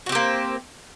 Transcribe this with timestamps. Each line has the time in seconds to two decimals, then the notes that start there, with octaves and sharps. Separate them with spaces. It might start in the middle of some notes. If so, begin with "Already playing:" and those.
0.06 F#4
0.09 C4
0.12 G4
0.15 A#3